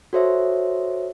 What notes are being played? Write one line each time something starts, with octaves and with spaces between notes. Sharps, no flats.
F#4 A4 C5 C#5 E5